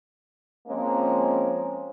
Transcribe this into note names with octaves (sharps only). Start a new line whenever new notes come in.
F3 G#3 A#3 C4 C#4